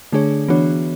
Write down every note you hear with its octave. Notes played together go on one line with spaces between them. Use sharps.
D3 A3 D4 G#4 C#5
E3 B3 D4 F#4 C#5